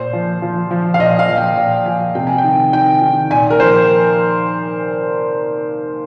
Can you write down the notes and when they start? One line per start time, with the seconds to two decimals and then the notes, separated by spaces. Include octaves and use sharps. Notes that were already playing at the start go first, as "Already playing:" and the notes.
Already playing: A#2 C5
0.13 F3
0.42 F3
0.71 F3
0.94 F5
0.99 A#2 D#5
1.19 F5
1.28 F3
1.37 G5
1.57 A#2 F5
1.86 F3 G#5
2.15 C3 G5
2.27 G#5
2.38 G5
2.44 D#3
2.73 D#3 G5
3.02 D#3
3.30 A#2 G#5
3.50 A#4
3.60 F3 C5